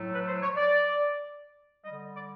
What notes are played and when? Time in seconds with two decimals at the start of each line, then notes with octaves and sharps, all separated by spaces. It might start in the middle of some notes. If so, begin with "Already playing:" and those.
Already playing: A2 F#3 A3
0.14 B4
0.28 C5
0.42 C#5
0.57 D5
1.84 D3 G3 D#5
2.14 D5